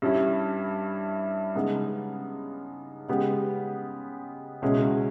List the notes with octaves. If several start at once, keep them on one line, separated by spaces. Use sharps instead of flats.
G2 G3 C#4 E4
C#3 G#3 B3 D#4
C#3 G#3 B3 G4
C#2 B2 G#3 C#4 E4